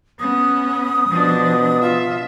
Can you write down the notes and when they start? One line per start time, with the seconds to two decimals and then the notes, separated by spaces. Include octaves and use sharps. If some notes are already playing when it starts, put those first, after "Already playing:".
0.19 B3 C#4 D#6
1.09 B2 F3 D4
1.82 F4 E5